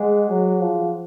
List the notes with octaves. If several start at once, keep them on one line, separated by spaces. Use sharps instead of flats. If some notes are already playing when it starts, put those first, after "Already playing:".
Already playing: G#3 G#4 C5 F#5
F#3
F3